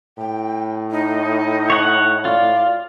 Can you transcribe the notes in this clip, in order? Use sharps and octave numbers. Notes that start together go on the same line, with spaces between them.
A2 G5
D#4
C#5 F#5
F4 D5